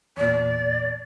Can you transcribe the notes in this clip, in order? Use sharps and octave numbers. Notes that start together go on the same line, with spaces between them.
E2 A#2 D5